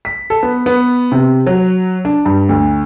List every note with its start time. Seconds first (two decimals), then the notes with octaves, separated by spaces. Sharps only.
0.05 B6
0.30 A4
0.43 B3
0.66 B3
1.12 C3
1.47 F#3
2.05 D4
2.26 G2
2.49 D2